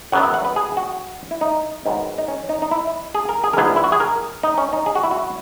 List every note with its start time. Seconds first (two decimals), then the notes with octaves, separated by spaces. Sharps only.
0.12 F#2 C#3 F#3 B3 F#5
0.23 E5
0.34 F#5
0.45 B4
0.56 G#4
0.77 F#4
1.31 E4
1.41 D#4
1.86 G#2 D#3 F#3 B3
2.18 D#4
2.28 C#4
2.49 D#4
2.62 D#4
2.71 E4
3.15 G#4
3.29 A#4
3.44 G#4
3.53 A#4
3.57 A#1 G#2 E3 B3 G#4
3.76 E4
3.84 F#4
3.92 G#4
4.00 A#4
4.43 D#4
4.58 C#4
4.73 D#4
4.86 G#4
4.95 F#4
5.03 E4
5.11 F#4